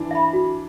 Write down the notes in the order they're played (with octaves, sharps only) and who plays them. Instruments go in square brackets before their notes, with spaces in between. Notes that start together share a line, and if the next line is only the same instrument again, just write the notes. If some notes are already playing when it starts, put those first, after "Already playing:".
Already playing: [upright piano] E3 D4
[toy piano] E5 B5
F#4